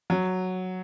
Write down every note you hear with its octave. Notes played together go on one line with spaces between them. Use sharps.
F#3